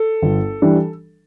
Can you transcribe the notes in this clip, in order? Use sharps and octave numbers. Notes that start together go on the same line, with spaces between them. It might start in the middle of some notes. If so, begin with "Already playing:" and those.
Already playing: A4
G1
E3 G3 D4